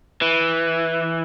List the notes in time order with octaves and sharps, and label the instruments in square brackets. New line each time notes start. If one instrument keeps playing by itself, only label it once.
[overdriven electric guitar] E3